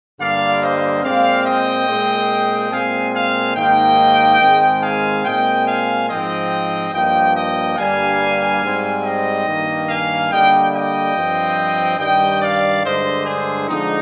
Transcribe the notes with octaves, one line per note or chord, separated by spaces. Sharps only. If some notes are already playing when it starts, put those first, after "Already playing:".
G2 D3 G3 A#3 D5 F5
C5 D#5
A#2 G#3 C4 D5 F5
D#5 G5
A#2 G#3 C4
A#2 G#3 C4 F5 G#5
F5 G#5
G#2 D#3 A#3 D#5 G5
G#2 D#3 G#3 C4
F5 G#5
A#2 G#3 C4 D#5 G5
F5 G#5
G#2 F3 C4 D#5 G5
G2 F3 A#3 D#5 G5
D#5 G5
G2 D3 G3 A#3 F5 G#5
G#2 G3 C4
D#5 G5
G2 D#3 A#3
F5 G#5
D3 G3 A#3 D#5 G5
D#5 G5
G2 F3 C4
G2 D#3 G3 D#5 G5
D5 F5
G2 D3 G#3 C5 D#5
G#4 C5
D3 F3 G#3 C4 D#4